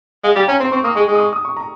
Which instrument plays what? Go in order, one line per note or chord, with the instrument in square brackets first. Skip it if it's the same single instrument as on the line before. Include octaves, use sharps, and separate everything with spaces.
[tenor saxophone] G#3 [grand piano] F5
[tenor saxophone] G3 [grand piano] G5
[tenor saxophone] C#4 [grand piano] A#5
[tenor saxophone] C4 [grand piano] C6
[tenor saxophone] C4 [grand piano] C#6
[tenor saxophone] A#3 [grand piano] D#6
[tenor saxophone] G#3 [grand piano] C#6
[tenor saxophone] G#3
[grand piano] D#6
C#6
D#6
C#6
A#5